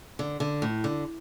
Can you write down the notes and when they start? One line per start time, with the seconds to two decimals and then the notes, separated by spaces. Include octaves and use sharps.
0.19 D3
0.40 D3
0.62 A2
0.84 D3